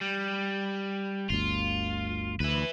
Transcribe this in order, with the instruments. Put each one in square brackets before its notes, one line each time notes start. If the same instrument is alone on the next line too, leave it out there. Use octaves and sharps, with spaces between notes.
[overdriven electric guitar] G3
[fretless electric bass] G1 D2 [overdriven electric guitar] F4
[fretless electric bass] D2 [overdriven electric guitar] E4 B4